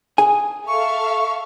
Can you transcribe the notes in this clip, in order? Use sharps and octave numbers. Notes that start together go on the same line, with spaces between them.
G#4 G#5
A4 E5 F5 C#6